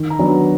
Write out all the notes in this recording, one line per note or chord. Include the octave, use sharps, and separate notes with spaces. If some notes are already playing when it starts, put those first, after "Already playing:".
Already playing: D#3
A#5
F#3 B3 D4